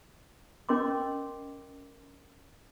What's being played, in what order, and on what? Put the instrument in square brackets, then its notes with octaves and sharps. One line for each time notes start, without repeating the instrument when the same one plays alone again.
[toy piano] C#4 A#4 D#5 C6 D6